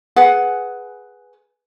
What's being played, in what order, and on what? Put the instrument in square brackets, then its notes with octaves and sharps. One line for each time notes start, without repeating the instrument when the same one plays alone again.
[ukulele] G#4 B4 F#5